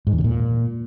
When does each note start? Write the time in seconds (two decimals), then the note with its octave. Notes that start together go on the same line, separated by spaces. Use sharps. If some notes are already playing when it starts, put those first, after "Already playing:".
0.07 G#2
0.13 E2
0.18 D3
0.24 A#2